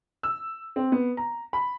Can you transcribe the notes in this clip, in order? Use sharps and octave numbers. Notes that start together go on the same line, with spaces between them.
E6
C4
B3
A#5
B5